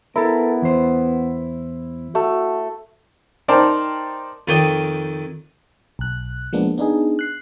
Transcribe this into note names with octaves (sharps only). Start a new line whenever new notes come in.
B3 E4 A4 A#4
E2 C5
A3 F#4
D#4 A#4 C5 D5 G5 A5
F2 D#3 C#5 D5 G5 D#6
B1 F#6
F3 G#3 A#3 B3 D4
B3 D4 D#4 G#4
F#6 C7